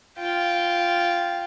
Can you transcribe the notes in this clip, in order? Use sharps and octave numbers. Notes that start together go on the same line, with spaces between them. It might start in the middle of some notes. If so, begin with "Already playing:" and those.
F4 G5